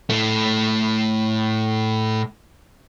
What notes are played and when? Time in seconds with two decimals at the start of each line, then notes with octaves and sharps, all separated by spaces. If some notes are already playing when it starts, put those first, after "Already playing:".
0.10 A2 A3